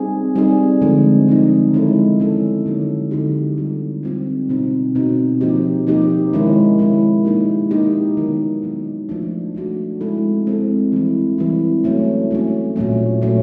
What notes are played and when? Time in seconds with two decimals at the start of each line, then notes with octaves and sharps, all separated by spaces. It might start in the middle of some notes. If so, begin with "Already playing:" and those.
Already playing: G3 C4 D#4 G#4
0.35 G3 C4 D#4 G#4
0.82 D3 F3 G#3 C4 D#4
1.28 D3 F3 G#3 C4 D#4
1.73 D#3 G#3 C#4 E4 A4
2.20 D#3 G#3 C#4 E4 A4
2.66 D3 F#3 A#3 D#4 G4
3.11 D3 F#3 A#3 D#4 G4
3.58 G3 C4 F4
4.03 G3 C4 F4
4.49 B2 G3 C4 D#4
4.95 B2 G3 C4 D#4
5.41 F3 A#3 D#4 G4
5.87 F3 A#3 D#4 G4
6.33 D#3 G#3 C#4 E4
6.79 D#3 G#3 C#4 E4
7.25 A#3 D#4 G4
7.71 A#3 D#4 G4
8.17 D#3 F#3 B3
8.62 D#3 F#3 B3
9.09 F3 A3 D4 F#4
9.55 F3 A3 D4 F#4
10.01 G#3 C4 E4 A4
10.47 G#3 C4 E4 A4
10.92 E3 G3 C4 E4
11.38 E3 G3 C4 E4
11.84 F#3 A3 C#4
12.31 F#3 A3 C#4
12.76 A#2 F#3 A3 C#4
13.22 A#2 F#3 A3 C#4